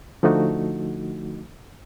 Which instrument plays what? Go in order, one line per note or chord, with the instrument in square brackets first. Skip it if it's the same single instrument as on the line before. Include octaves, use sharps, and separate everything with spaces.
[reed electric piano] D3 F3 A3 D#4 F#4